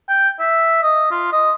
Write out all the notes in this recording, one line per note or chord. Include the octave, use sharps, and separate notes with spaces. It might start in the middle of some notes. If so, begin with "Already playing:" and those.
G5
E5
D#5
F4
D#5